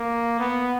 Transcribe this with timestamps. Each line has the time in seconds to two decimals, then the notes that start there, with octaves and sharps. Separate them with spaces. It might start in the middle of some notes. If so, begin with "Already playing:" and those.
Already playing: A#3
0.39 B3